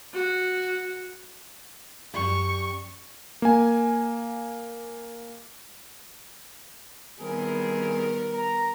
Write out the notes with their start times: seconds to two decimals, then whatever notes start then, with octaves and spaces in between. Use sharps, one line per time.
0.13 F#4
2.14 F#2 G4 D5 C#6
3.42 A#3 G#5
7.21 D#3 G3 B3 C4 E4 G#4 A#4
8.34 A#5